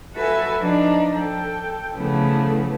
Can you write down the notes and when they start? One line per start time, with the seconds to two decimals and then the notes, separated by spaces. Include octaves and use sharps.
0.15 F#4 A4 B4 E5 G#5
0.60 F3 D4 D#4
1.17 A4 G5
1.95 C#3 E3 F3 A3 B3